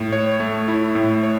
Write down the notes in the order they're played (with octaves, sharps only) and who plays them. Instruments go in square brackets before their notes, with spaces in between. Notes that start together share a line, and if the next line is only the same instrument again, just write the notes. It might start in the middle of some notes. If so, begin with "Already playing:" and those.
Already playing: [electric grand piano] A2
C#5
A3
E4
A2
C#5